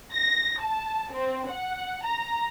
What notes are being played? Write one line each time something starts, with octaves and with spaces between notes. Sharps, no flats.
A#6
A5
C4
F#5
A#5